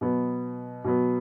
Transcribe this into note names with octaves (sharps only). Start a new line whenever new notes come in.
B2 F#3 B3
B2 F#3 B3